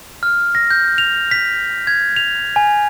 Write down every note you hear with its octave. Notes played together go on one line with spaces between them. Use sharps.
F6
A#6
G6
F7
B6
G#6
F7
G#5